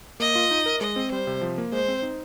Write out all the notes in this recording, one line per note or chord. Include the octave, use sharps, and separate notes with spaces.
A#3 D#5
F4
D#4
A#4
G#3 D#5
C4
G3 C5
C3
F3
A#3
G#3 C5
C4
D#4